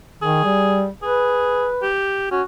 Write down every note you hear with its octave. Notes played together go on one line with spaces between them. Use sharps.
D#3 G#4
G3
G#4 B4
G4
C#4 F#4